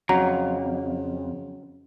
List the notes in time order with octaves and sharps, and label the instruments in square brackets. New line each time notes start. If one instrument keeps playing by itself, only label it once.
[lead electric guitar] F2 [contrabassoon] C#3 [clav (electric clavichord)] F#3 [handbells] A#5